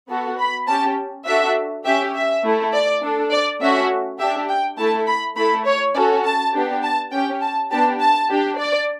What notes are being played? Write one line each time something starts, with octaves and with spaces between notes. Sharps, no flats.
B3 F#4 A4
B5
C#4 G4 A5
D4 F#4 A4 E5
C#4 G4 E5
E5
A3 E4 A4
D5
D4 A4
D5
A3 C#4 F#4 E5
D4 G4 E5
G5
A3 E4 A4 A5
B5
A3 E4 A4 B5
C#5
C#4 F#4 A4 D5
A5
B3 D4 G4
A5
C#4 G4 G5
A5
B3 D4 G4 A5
A5
D4 G4
D5